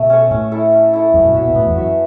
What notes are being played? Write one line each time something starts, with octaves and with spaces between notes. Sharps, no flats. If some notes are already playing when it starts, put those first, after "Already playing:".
Already playing: B2 A3
C#4 A4 C#5
A2 C#4
E4 A4
C#4
E4 A4
F#2 B3
B2
B2 F#4 C#5 E5
B2
A2 B3
E2
F#2 F#4 C#5 E5